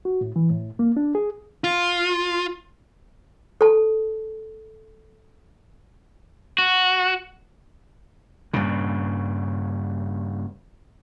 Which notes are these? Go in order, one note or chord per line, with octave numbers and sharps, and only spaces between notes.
F#4
A2
E3
A2
A#3
D4
G#4
F4
A4 A5
F#4
G2 A#2 C#3